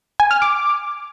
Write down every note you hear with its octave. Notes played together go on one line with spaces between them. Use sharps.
G#5
F6
D6